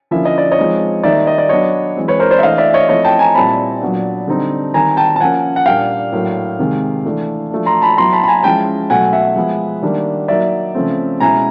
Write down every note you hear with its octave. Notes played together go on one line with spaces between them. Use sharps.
D3 F3 A#3 C#4 E4 E5
D#5
D5
C#5 D#5
F3 G#3 C4 D#4
D#3 G3 A#3 D#4 D5 E5
D#5
D5
F#3 B3 D4 C#5 D#5
E3 G#3 C4
B4 C#5
A#4 C5
C5 D5
E5
E3 A3 D4 D#5 F5
D5 E5
C#5 D#5
F3 A3 C4 E4 C#5 D#5
G5 A5
G#5 A#5
A#2 G3 C4 E4 A5 B5
A#2 F#3 B3 D4
D3 G3 C4 D#4
D#3 G3 C4 G#5 A#5
G5 A5
A5
F3 A#3 C#4 F#5 G#5
F#5
A#2 G3 A#3 D4 F5 G5
A2 F#3 A#3 D4
C3 D#3 G#3
E3 A3 D4
F3 A3 D4
A#5 C6
A5 B5
F#3 B3 E4 A#5 C6
A5 B5
B5
G#5 A#5
F3 G#3 C#4 E4 G5 A5
B2 F#3 A3 F#5 G#5
E5 F#5
F3 G#3 B3
D#3 G3 A#3 D4
F#3 A#3 D#4 D5 E5
C#3 F3 A3 C4
B2 G#3 C#4 E4 G#5 A#5